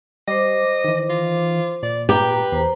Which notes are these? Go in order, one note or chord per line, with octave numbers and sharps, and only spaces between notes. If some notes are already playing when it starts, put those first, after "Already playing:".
G3 C5 D#5 D6
D#3 E3
F4
A#2 D5
G4 B4 A#5
E2 C5 A#5